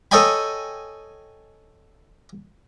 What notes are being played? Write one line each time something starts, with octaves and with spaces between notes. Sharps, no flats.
A4 C#5 D#5 G5 G#5 B5